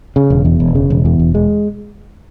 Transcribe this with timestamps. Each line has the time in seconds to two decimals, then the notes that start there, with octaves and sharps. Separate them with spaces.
0.16 C#3
0.30 E1
0.45 E2
0.60 E1
0.75 C#3
0.90 E1
1.05 E2
1.20 E1
1.35 G#3